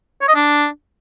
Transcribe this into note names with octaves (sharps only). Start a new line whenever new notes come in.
C#5
D#5
D4